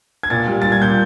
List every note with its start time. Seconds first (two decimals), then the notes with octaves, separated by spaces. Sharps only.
0.23 G#6
0.30 A#2 A6
0.47 G3
0.62 G3 A6
0.72 G#6
0.81 A#2 G6